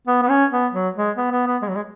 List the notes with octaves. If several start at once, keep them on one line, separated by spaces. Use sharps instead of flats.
B3
B3
C#4
B3
F#3
G#3
B3
B3
B3
G#3
F#3
G#3